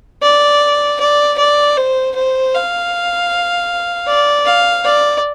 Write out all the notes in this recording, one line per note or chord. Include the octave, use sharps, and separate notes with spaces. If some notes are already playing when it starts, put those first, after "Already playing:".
D5
D5
D5
C5
C5
F5
D5
F5
D5